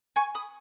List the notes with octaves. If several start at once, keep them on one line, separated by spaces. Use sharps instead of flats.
G#5 C#6
B5 D#6